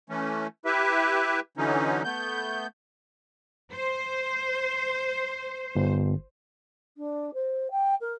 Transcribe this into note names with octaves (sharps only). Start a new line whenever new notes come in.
E3 A3 C#4
E4 G4 B4 E5
D3 E3 F#3 C#4 D#4
A3 B3 G6
C5
G1
D4
C5
G5
A#4